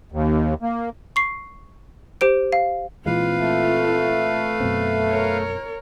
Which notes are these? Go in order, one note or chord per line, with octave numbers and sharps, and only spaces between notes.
D#2
A#3
C#6 C7
G4 C5 D7
F5
A#2 E3 G#3 C4 F4 B4 F5
A3
F#2 B2 C4
A#4 C#5